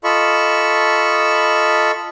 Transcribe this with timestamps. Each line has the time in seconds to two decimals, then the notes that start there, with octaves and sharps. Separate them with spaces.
0.04 F4 A4 D#5 B5 C#6